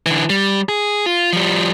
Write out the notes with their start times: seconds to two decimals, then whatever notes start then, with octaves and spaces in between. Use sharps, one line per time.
0.06 D3 E3
0.30 G3
0.69 G#4
1.06 F4
1.33 F3 G3